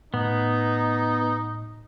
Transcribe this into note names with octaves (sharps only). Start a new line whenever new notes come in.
A2 B3 D#4